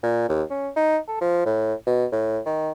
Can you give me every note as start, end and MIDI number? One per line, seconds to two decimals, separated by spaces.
0.03 0.28 46
0.29 0.42 39
0.50 0.69 61
0.76 0.98 63
1.08 1.16 69
1.21 1.42 53
1.45 1.74 45
1.86 2.06 47
2.12 2.39 45
2.46 2.72 51